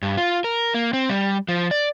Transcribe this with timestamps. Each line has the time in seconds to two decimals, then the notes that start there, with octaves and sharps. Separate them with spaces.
0.02 G2
0.17 F4
0.44 A#4
0.74 A#3
0.93 C4
1.09 G3
1.48 F3
1.71 D5